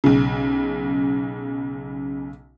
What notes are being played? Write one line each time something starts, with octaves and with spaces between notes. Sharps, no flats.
B1 C#3